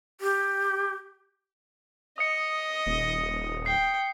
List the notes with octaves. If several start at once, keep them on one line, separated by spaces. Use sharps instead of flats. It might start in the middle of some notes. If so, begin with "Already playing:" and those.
G4
D#5 D#6 C#7
D#1
G5 C7